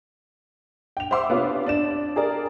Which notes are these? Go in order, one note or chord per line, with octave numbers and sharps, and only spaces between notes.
G5 F7
C5 E5 F#5 C6 D6 E6
C3 B3 C#4 D4 F4 F5
D4 D5 E7
G4 G#4 A#4 D5